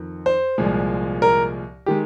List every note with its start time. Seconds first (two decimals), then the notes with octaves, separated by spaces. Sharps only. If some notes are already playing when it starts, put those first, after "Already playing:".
Already playing: F2 D#3
0.26 C5
0.58 C2 A#2 F3 G#3
1.22 A#4
1.86 D#3 G#3 G4